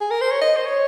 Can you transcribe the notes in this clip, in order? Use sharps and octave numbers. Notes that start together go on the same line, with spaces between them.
G#4
A#4
C5
C#5
D#5
C5
C#5